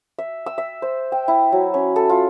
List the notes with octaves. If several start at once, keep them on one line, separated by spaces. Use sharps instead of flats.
E5
E6
E5
C5
G5
E4
F#3
C#4
A4
F4